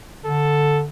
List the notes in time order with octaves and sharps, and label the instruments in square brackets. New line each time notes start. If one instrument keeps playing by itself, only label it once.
[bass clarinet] D3 [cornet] A4